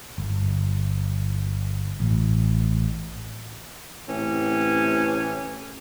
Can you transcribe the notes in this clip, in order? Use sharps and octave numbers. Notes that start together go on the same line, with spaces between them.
G1
A1
A2 C3 E3 C#4